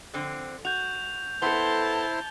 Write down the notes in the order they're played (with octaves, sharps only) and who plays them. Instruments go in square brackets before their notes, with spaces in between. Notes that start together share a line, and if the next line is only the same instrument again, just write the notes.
[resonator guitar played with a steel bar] F2 D3 C4
[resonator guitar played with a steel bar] F#4 [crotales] G6 F7
[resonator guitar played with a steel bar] B3 A4 [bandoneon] E4 C5 C6 [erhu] A5 [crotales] G7